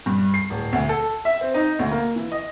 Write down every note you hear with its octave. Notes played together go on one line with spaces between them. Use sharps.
G2
C7
D1
D2
A4
E5
C4
D#4
D2
A#3
E3
D#5